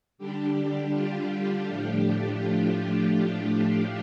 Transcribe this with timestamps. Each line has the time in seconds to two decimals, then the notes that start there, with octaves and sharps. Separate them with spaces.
0.18 D3 G3 D4 G4
0.92 F4
1.66 A2 F3 A3 D4 G4
2.39 F4